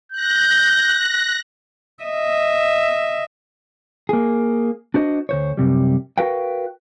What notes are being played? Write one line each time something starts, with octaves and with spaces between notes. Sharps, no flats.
F#6 G6 A#6
D#5 E5
A#3 G#4
D4 F#4 C5 D#5
D2 C5 C#5
F#2 C3 G3
F#4 A#4 B4 F5 G5